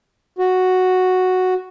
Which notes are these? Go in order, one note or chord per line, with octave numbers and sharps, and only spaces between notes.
F#4